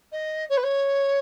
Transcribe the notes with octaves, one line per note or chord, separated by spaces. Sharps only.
D#5
C#5
B4
C#5